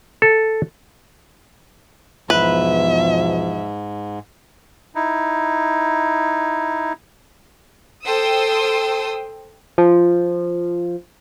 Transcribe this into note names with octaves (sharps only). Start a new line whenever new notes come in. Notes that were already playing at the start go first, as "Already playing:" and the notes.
A4
E2 G#2 B2 F3 B4 E5
D#4 E4
A4 C5 G5 C6 D#6 E6
F3